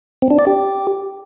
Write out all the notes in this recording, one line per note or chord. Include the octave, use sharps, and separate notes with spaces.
C4
D4
D5
G4